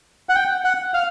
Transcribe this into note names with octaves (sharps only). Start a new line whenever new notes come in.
F#5
G5
F#5
F5